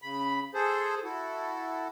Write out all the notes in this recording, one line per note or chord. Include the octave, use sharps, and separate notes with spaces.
C#3 B5
G#4 A4 C5
E4 F#4 A4